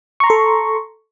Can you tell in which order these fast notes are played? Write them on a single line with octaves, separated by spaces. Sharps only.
C#6 A#5 C6 A4